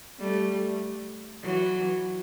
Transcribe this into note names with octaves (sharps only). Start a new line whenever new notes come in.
G3 A3
E3 F#3